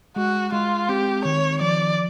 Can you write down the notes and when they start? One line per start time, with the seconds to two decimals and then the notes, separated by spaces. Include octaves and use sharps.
0.16 G#3 F#4
0.52 G#3 F4
0.89 C4 G4
1.25 D#3 C#5
1.61 F3 D5